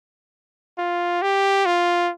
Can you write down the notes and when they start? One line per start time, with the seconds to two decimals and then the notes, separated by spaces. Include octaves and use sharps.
0.78 F4
1.22 G4
1.66 F4